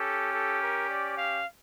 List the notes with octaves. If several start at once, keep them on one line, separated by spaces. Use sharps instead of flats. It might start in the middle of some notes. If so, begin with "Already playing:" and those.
Already playing: C#4 G4 A4
A4
A#4
D5
F5